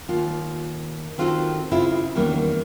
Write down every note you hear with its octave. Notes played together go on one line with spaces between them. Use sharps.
D#2 F4
D#3 C4 F4 F#4 G#4 A4
C#3 C4 E4 F4
E2 D#3 G3 A#3 C#4